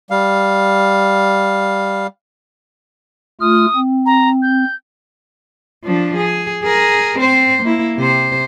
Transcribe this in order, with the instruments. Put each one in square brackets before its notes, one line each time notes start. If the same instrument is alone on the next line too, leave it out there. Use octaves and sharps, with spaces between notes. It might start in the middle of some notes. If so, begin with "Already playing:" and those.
[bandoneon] G3 F5
[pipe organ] A3 F4 F6 [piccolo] D#6
[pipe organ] C4
[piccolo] A#5
G6
[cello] F3 D4
G#4
G#4 A#4
C4 C5
A#3 E4
C3 C5